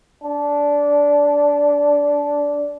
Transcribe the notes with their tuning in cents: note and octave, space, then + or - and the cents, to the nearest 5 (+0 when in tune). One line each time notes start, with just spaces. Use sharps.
D4 -15